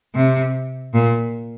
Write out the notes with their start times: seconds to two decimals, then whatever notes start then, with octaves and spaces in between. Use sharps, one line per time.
0.14 C3
0.93 A#2